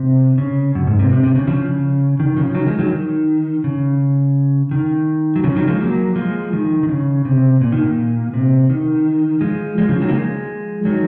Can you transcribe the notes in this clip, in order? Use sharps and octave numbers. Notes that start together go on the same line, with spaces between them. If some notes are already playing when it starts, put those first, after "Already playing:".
Already playing: C3
C#3
F#2
G#2
C3
C3
C3
C#3
C#3 F3
C#3
D#3
C#3 F3
D#3 F#3
F3 G#3
D#3 F#3
D#3
C#3
D#3
F#3
C#3 F3
D#3 F#3
F3 G#3
F#3 A#3
F3 G#3
D#3
D#3
C#3
C3
A#2
D#3
A#2
C3
D#3
F3 G#3
F3 G#3
C#3 F3
D#3 F#3
A#3
F3 G#3
D#3 F#3